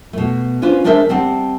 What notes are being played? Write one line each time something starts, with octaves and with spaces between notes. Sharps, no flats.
B2 A3
C#4 D4 F4 B4 C5
G#3 D4 A#4 C5 D5 E5
G3 C4 F#5 A5